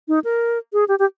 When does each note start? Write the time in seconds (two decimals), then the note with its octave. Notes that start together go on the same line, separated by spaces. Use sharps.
0.08 D#4
0.24 A#4
0.73 G#4
0.88 G4
0.99 G4